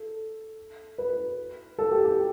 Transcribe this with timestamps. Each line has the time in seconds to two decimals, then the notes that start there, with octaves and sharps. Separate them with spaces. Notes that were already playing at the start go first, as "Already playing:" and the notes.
Already playing: A4
0.98 B4
1.78 A4
1.91 G4
2.05 G4